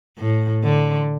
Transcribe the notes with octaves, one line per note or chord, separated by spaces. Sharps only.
A2
D3